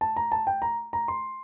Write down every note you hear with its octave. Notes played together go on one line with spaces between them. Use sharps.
A5
A#5
A5
G5
A#5
A#5
C6